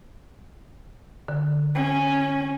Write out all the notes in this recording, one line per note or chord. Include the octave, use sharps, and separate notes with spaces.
D3
C#4